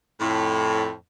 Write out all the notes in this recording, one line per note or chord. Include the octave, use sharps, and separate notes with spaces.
F2 A2